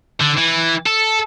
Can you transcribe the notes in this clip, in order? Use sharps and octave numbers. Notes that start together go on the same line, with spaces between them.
D3
E3
A4